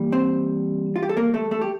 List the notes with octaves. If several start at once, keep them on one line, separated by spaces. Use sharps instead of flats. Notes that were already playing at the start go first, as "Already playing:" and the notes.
Already playing: E3 G3 A#3
C4 C5
F4
G4
A4
A#3 A#4
A3 A4
A3 A4
G4